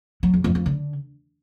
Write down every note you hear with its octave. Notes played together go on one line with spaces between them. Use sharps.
F#3
E2
F2
F2
D3